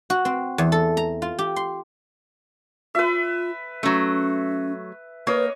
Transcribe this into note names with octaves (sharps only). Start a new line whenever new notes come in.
F#4
C4
E2
A4
A#5
F4
G4
C6
F4 B4 E5
F#3 A3 C#4
A#3 B4 C#5 D#5